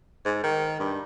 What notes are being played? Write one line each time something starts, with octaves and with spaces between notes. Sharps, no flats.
G#2
D#3
G2